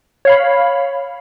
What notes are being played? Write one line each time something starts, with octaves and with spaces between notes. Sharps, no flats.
C#5 F5 B5